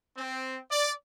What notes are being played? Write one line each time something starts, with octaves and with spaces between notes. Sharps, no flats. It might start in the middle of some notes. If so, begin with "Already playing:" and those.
C4
D5